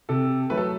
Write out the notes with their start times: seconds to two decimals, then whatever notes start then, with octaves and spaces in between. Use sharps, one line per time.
0.09 C3 A4
0.50 F#3 A3 B4
0.57 A4